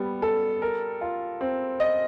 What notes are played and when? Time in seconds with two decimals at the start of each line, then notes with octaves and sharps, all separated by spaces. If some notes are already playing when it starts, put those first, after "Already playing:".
Already playing: G3 B3
0.22 A4
0.62 A#4
1.01 F4
1.41 C4
1.80 D#5